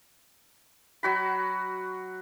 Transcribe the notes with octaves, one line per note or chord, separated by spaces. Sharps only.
F#3 F#4 B5